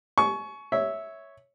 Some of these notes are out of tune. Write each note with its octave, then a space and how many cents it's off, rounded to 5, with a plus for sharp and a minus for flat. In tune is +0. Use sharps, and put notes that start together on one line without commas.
G#5 +40 C#6 +10
C#5 +0 E5 -10